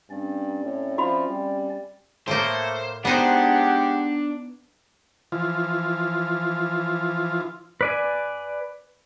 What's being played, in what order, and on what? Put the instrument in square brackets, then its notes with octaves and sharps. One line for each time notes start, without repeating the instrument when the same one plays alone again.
[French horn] G2 [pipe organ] C4 C#4 D5
[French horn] A2
[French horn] F3 [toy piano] F#4 E5 B5
[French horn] G3
[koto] A2 A#3 [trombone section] A3 [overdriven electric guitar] C5
[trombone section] G#3 G4 [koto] B3 D#4 C5 [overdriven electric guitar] D4 [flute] F#5
[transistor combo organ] E3 F3 F4
[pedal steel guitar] B4 D5 G#5